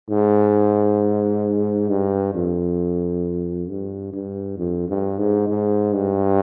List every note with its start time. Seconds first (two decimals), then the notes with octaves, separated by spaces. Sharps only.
0.09 G#2
1.89 G2
2.34 F2
3.69 G2
4.13 G2
4.58 F2
4.88 G2
5.18 G#2
5.47 G#2
5.93 G2